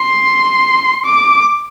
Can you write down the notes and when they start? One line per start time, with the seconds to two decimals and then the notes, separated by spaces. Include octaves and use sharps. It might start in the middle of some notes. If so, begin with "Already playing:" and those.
Already playing: C6
1.06 D6